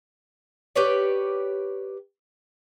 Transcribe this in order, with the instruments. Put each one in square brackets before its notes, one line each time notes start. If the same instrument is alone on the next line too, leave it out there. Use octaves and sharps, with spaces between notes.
[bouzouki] G4 B4 C#5 D5